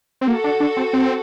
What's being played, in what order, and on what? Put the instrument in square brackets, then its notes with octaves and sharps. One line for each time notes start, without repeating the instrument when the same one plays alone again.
[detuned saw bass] C4
[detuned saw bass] A#3 [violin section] F#4 A4
[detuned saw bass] D4
D4
C4
C4